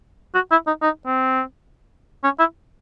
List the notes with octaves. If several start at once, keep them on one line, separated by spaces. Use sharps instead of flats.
F#4
E4
D#4
D#4
C4
C#4
E4